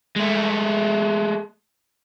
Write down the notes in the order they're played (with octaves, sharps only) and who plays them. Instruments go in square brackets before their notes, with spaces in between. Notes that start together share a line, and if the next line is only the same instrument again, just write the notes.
[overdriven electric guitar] G#3 A3